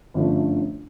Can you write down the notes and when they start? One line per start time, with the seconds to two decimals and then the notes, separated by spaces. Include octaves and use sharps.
0.14 G1 F#2 D3 F3 A3